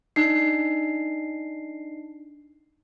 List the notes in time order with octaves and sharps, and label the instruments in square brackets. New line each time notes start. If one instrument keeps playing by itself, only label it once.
[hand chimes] D4 D#4 C7